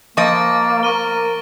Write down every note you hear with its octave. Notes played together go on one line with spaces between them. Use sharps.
F3 A#3 D#5 C#6 A6 D7
A#4 C#6 D#7 G7